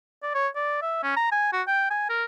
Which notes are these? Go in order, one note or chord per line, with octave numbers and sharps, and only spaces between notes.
D5
C#5
D5
E5
C#4
A#5
G#5
F#4
G5
G#5
A#4